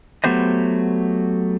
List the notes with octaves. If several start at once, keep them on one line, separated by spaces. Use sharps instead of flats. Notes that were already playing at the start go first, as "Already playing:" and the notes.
F#3 A3 B3 G4 C5 D#5